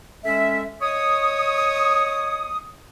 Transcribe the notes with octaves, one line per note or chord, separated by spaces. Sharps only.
G#3 C#4 A4 E5
C#5 D#5 C#6 D#6